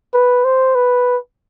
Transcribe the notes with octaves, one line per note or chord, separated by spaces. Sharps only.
B4
C5
B4